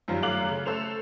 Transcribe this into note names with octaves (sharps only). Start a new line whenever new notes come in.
F#2 D#3 F3 G3
F#2 A3 F5 D6 F#6 F#7
C#3
A3 A4 C5 E7 F7